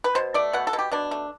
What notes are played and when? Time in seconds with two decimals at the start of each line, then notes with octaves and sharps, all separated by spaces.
0.04 B4
0.15 B2 C5
0.34 A3 D5
0.53 B2 F#5
0.67 A4
0.73 B2
0.79 G4
0.92 B2 D4
1.11 A3